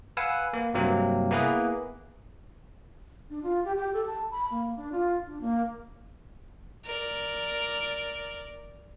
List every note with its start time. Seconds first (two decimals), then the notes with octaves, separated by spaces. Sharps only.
0.17 B4 F5 F#5 G#5 E6
0.53 A#3
0.74 G2 C3 F#3 A#3 C4
1.30 A#3 B3 E4 G#4 B4
3.30 D4
3.43 F4
3.65 G4
3.77 G4
3.93 A4
4.07 A5
4.31 B5
4.50 A#3
4.76 D4
4.92 F4
5.27 D4
5.41 A#3
6.85 A#4 D5